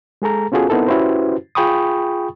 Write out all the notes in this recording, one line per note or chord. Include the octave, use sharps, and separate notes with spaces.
G#3 G#4 A4 A#5
B3 C#4 F4 F#4 G#4 A4
B3 C4 D#4 E4 A4 A#4
C#4 E4 F#4 G4 B4 C5
F4 G#4 G5 B5 C#6 D#6